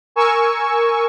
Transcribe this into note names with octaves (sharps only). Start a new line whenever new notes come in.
A#4 G#5 C#6 E6